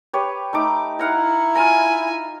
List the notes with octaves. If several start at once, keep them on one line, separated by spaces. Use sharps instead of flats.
G4 B4 C#5
A3 D#4 D6
E4 F5 F#5 A#5
F4 G#5 A#5